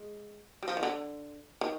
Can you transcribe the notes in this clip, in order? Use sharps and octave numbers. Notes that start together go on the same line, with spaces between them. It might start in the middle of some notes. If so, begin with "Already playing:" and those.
Already playing: G#3
G3
F3
D#3
D3
D#3